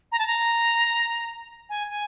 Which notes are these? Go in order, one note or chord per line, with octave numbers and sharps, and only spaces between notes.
A#5
A5
A#5
G#5
G#5